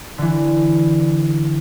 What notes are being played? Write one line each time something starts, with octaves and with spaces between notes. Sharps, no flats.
D3 E3